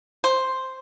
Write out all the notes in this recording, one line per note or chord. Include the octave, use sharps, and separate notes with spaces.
C5